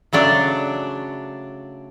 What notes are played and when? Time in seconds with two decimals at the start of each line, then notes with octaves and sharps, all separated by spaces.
0.13 C#3 F#3 A3 D4